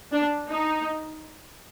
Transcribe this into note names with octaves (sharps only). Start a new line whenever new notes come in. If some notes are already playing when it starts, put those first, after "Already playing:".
D4
D#4